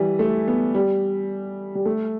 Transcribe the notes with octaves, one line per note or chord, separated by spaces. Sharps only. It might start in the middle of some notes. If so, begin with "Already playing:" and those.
Already playing: E3 G3
A3
B3
G3
G3
A3